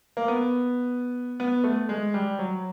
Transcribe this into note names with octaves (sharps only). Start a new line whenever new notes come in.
A#3
B3
B3
A3
G#3
G3
F#3